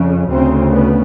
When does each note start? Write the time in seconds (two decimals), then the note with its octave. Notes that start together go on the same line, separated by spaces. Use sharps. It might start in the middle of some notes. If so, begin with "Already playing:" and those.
Already playing: F2 C#3
0.30 D2 C#3 C4
0.72 B3